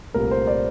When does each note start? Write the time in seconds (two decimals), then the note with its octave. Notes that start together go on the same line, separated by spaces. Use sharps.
0.14 C2 A#2 A3 A#4
0.31 C5
0.47 D5